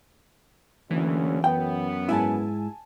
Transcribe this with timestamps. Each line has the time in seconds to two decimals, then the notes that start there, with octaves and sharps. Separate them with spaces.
0.91 F#1 D2 E3 C#4
1.44 F#2 B3 G5
2.09 G#2 E4 G#5 A5